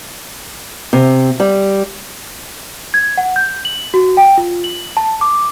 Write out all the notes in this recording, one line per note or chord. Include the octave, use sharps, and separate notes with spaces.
C3
G3
G#6
F#5
G6
F#7
F#4
G5
F4
F#7
A5
D6